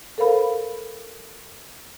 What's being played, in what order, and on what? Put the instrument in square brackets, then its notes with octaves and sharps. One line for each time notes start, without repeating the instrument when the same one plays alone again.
[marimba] A4 A#4 C5 F5 B5